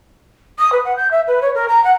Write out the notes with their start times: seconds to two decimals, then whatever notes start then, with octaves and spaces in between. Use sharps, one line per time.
0.58 D#6
0.72 B4
0.84 F#5
0.96 G6
1.11 E5
1.27 B4
1.41 C#5
1.55 A#4
1.68 A#5
1.84 F#5